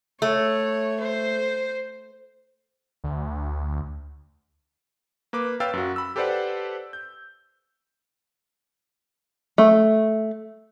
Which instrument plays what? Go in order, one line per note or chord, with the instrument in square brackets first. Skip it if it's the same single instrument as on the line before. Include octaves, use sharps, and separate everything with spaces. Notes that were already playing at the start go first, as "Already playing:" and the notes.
[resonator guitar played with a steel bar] A3 [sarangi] C#5
[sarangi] C5
[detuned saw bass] D2
[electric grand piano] A#3 B4 D6
B4 C#5 F5 G5 E6 A6
F#2 F#4
B5 E6
G4 A4 B4 C5 D5 F#5
G6
[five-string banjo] A3